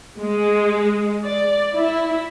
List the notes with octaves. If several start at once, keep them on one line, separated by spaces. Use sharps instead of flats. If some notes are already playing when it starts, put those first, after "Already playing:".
G#3
D5
E4